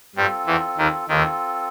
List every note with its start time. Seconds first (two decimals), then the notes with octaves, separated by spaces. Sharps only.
0.16 G2 G3 C4 F4 A4
0.47 E2 E3
0.78 D#2 D#3
1.08 D#2 D#3 C4 F4 A4